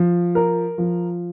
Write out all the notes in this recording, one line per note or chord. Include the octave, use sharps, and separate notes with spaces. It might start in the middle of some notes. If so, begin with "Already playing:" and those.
Already playing: F3
A#4
F3